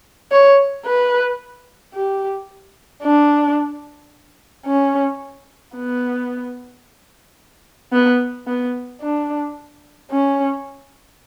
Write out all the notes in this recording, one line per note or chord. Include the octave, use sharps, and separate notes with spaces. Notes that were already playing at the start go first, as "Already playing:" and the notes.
C#5
B4
G4
D4
C#4
B3
B3
B3
D4
C#4